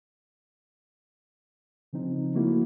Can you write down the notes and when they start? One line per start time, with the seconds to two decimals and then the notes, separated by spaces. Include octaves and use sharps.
1.93 C#3 F3 C4 D#4
2.34 F3 A3 A#3 E4 F#4